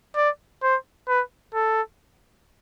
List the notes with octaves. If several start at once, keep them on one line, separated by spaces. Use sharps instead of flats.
D5
C5
B4
A4